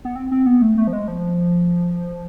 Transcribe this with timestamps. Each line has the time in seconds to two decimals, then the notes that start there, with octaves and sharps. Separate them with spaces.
0.05 B3
0.16 C4
0.31 C4
0.46 B3
0.62 A3
0.77 A3
0.87 F3
0.93 G#3
1.08 F3